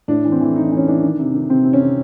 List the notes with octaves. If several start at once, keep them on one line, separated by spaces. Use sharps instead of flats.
A2 D4
E3
C4
E3
E3 D#4
D4
E3
C#4
E3 D4
D#3
C3
D#3
C3 C4
C3
C#4
C3